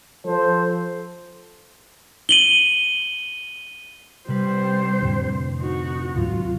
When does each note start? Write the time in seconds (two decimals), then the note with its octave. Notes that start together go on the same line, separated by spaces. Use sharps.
0.25 F3 A4 C5
2.29 D#7 F#7 G7
4.29 C3 G3 B4 C5
5.01 F2 A2 D3
5.58 D#4 F#4
6.15 D2 G#2 F#3 F4